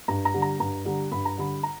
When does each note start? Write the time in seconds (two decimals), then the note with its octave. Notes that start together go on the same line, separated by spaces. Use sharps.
0.08 G2 A#5
0.25 A#5
0.34 D3 G3
0.42 A#5
0.60 G2 A#5
0.85 D3 G3
1.12 G2 B5
1.25 A#5
1.38 D3 G3 B5
1.63 A#5